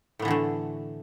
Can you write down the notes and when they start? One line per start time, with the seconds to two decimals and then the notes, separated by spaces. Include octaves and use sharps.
0.19 A2
0.22 B3
0.25 E3
0.28 D3
0.31 A3